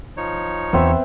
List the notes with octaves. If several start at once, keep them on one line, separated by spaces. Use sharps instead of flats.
F3 D#4 C#5
E2 B3 C4 E5